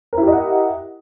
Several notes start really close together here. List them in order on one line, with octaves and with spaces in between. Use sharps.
A#4 E4 G4 D#5 F#5